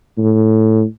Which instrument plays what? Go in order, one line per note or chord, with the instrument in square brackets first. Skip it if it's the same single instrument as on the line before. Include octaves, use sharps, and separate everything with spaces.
[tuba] A2